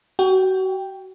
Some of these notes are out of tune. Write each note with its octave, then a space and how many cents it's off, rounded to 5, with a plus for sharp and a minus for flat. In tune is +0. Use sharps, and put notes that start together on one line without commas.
F#4 +30 G5 +0